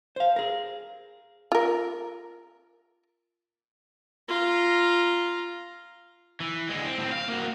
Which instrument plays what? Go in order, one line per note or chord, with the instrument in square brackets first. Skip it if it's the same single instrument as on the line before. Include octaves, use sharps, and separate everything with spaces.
[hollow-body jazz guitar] C5 F5
G#4 A#4
[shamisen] F4 A#4
[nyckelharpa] F4 A#5
[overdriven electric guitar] E3
D3 G#3
C4
A2 C4
F5
A#3 F#4